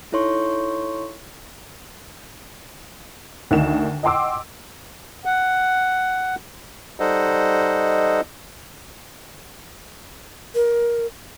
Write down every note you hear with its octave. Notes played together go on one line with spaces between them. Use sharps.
D#4 E4 A4 C#5 C6 C#6
D2 D#3 D#4 E7
D#5 F#5 G5 C6 D6 E6
F#5
G3 D#4 A4 C5 D#5 F#5
A#4